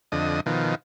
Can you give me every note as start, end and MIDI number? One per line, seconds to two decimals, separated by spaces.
0.12 0.40 41
0.12 0.40 50
0.12 0.40 75
0.46 0.75 47
0.46 0.75 51
0.46 0.75 53